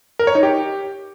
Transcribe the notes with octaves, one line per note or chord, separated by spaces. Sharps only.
A#4
C#5
D#4
G4